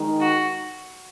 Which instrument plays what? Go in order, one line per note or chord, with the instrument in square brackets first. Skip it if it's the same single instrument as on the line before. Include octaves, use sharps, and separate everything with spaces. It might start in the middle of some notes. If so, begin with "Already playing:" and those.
Already playing: [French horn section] D#3 G#3 D#4
[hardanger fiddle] F#4